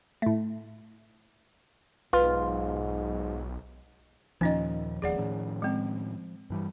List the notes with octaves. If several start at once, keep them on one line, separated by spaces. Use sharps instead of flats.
A2 A3
B1 G#2 F4 B4
D#2 A#2 D#3 F3 C#4 D#4 D#5
E1 D#2 G#4 D5 F#5
A2 D#3 C#4
G#3 C4
G2 E3 G3